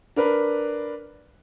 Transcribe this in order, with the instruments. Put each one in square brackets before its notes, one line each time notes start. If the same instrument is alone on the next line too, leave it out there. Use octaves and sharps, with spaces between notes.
[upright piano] D4 A#4 B4